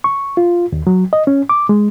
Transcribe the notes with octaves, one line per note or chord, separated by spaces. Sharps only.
C#6
F4
D#2
F#3
D#5
C#4
D6
G#3